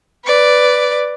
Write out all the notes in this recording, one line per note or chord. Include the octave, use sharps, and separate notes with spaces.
B4 D5